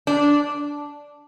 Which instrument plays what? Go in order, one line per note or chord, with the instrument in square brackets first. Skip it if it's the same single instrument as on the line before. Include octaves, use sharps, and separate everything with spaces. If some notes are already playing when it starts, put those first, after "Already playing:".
[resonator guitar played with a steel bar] D4